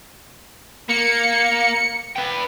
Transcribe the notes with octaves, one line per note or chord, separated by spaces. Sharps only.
A#3 C#7
B4 G5